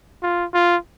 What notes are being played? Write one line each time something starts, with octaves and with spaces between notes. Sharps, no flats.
F4
F4